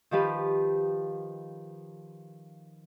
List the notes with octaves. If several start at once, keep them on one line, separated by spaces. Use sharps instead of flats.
D#3 F3 G4 B4